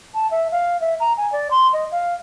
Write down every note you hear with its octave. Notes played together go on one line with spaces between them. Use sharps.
A5
E5
F5
E5
A#5
G#5
D5
C6
D#5
F5